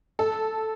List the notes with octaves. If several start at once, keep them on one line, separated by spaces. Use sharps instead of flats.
A4